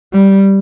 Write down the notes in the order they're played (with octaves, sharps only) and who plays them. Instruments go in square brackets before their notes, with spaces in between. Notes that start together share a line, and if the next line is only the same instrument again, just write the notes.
[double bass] G3